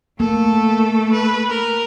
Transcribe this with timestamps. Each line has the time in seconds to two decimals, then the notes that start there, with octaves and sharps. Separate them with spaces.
0.20 A3 A#3 A4
1.12 B4
1.50 A#4